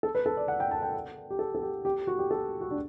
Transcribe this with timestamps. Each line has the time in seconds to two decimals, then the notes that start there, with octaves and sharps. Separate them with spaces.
0.03 A4
0.15 B4
0.26 A4
0.37 D5
0.48 F#5
0.60 G5
0.71 A5
0.83 G5
1.30 G4
1.39 A4
1.55 A4
1.62 G4
1.85 G4
2.07 F#4
2.19 G4
2.31 A4
2.61 F#4
2.71 D4